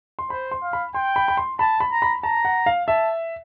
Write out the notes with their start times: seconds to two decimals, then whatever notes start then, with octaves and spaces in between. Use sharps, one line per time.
0.19 C6
0.30 C5 B5
0.51 C6
0.62 F5
0.73 B5
0.95 G5 C6
1.16 B5
1.28 B5
1.37 C6
1.59 A5 B5
1.80 B5
1.92 A#5
2.02 B5
2.23 A5 A#5
2.45 F#5
2.66 F5
2.88 E5 A5